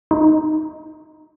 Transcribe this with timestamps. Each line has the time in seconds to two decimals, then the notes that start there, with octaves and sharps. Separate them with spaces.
0.11 D#4